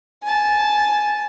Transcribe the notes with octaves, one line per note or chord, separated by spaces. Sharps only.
G#5 A5